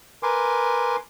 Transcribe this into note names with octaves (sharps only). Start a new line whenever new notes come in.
A#4 B4 G#5 C6 D6